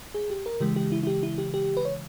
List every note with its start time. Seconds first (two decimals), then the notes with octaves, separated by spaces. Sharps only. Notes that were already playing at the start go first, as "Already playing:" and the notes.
0.14 G#4
0.30 G4
0.46 A#4
0.60 C#3 E3 G#3 G4
0.76 G4
0.92 E4
1.03 E4
1.07 G4
1.23 E4
1.38 G4
1.54 G4
1.77 B4
1.85 C#5